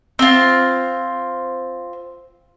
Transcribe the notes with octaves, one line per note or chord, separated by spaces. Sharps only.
C4 F4